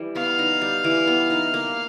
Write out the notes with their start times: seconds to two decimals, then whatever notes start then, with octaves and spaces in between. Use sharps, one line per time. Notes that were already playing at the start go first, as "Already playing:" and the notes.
Already playing: E3 G3
0.16 B3 F5
0.39 D#4
0.62 G3
0.84 E3
1.07 B3
1.30 D#4
1.54 A#3